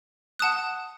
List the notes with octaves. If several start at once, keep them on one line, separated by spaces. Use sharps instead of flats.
F#5 A5 D#6 F#6